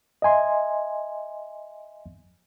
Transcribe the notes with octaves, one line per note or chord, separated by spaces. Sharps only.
D#5 E5 G#5 C6